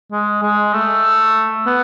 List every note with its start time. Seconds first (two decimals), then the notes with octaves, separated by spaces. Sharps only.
0.12 G#3
0.42 G#3
0.73 A3
1.66 B3